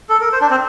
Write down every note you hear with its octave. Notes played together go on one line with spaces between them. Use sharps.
A4
A#4
C5
D4
C4